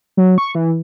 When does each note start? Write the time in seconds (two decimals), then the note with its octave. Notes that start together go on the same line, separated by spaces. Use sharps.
0.17 F#3
0.38 C#6
0.55 E3